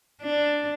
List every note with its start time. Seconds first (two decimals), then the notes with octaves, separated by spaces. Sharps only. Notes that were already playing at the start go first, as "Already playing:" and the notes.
0.22 D4